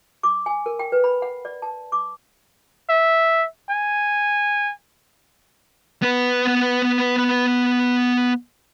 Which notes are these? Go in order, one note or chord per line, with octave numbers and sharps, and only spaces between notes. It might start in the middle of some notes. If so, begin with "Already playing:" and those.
D6
G#5
A#4
G5
B4
B5
F#5
D5
A5
D6
E5
G#5
B3 B4